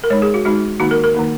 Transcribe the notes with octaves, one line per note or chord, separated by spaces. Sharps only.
A#4
G#3 D#4 C#5
G#4
F#4
G#3 D#4 F#4
D#3 A#3 D#4 F#4
A#4
A#4
D#3 A#3 D#4